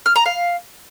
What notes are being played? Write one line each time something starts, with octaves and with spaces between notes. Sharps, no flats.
F6
A#5
F5